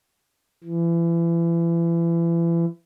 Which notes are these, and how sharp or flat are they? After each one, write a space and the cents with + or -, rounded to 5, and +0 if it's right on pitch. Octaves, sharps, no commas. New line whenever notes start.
E3 +35